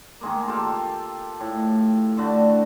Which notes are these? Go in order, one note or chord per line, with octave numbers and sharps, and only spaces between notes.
D#3 G#3 A#3
F4 G4 A4
A2
D3 A3 F#4